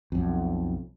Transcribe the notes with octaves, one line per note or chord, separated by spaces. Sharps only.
B1 F2